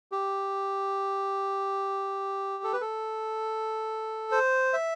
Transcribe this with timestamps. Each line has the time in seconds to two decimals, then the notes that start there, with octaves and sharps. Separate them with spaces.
0.12 G4
2.64 A4
2.73 B4
2.81 A4
4.32 C5
4.73 E5